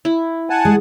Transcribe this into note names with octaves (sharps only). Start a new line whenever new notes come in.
E4
F#5 G#5 A5
G#3